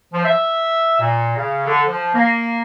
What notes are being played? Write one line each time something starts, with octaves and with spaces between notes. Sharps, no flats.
F3
E5
A#2
C#3
D3
F3
A#3